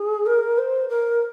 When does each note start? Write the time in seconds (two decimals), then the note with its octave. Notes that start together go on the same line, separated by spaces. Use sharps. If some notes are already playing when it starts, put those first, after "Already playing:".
Already playing: G#4
0.26 A#4
0.58 C5
0.89 A#4